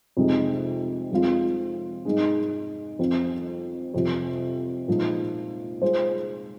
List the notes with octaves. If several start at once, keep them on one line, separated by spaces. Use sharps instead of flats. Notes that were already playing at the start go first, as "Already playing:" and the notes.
F2 C3 G#3 D#4
F2 F3 G#3 C4 F4
G#2 G#3 D#4 G#4
F2 F3 C4 F4
F2 C3 F3
A#2 F3 G#3 D#4
G#3 F4 G#4 C5